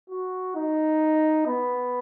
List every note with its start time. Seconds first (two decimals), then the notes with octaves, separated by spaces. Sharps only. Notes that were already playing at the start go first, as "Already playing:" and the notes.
0.10 F#4
0.56 D#4
1.47 B3